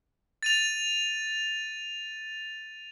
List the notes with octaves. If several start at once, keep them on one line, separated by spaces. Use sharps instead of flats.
A6 D#7 F7